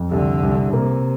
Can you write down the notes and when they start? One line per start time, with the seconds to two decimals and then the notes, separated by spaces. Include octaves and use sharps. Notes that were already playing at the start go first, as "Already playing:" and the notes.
Already playing: F2
0.11 C2 D3
0.43 C2
0.73 C3 A#3